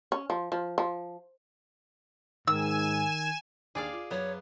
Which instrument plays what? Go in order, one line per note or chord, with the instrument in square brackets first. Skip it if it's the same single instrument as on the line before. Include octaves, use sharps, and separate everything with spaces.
[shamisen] C#4
F3
F3
F3
[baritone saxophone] G#2 [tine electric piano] D#3 [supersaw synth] G#5 E7 [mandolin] E6
[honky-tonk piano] D#2 D4 D6 [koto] G#4 D5 F5
[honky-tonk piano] F4
[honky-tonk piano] F#2 [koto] B3 [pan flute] C#5